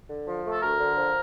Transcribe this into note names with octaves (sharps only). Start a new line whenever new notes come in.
D3
F3
A3
A4
D2 A#4
D3
F3